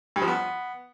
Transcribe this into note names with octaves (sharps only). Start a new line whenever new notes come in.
G2
F3
B3